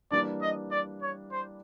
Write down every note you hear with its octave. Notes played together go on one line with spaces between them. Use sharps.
E3 G3 A#3 D4 D5
D#5
D5
C#5
C5